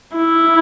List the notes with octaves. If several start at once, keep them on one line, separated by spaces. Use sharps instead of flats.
E4